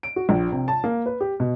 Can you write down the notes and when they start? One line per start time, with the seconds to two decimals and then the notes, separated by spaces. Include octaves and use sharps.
0.03 D7
0.16 F#4
0.29 A#1
0.52 C3
0.68 A5
0.84 A#3
1.06 B4
1.21 G4
1.40 B2